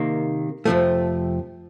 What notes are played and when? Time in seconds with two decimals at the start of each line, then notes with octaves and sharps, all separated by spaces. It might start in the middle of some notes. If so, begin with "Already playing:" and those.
Already playing: C3 D#3 A#3
0.65 F2 C3 F3 A3